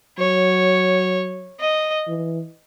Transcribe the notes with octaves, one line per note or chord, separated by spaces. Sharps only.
F#3 C#5
D#5
E3